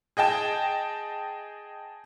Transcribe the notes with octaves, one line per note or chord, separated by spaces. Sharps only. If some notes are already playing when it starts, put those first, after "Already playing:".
G#4 D#5 G5 A5